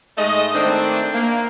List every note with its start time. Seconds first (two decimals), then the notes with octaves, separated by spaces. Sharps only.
0.17 G#2 G#3 A3 D#5
0.53 D#3 A3 C4 D4
1.14 A#3